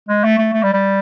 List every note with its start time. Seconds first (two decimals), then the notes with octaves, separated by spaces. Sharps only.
0.09 G#3
0.24 A3
0.38 A3
0.53 A3
0.63 G3
0.73 G3